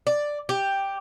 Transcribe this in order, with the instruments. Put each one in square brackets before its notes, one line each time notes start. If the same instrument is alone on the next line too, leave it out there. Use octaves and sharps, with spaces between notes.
[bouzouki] D5
G4